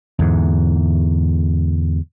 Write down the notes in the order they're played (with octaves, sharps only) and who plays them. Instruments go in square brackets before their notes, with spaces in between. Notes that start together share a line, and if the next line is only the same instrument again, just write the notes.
[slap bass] E2 G#2 D3